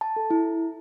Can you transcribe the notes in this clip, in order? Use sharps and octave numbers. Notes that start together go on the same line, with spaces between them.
A5
A4
E4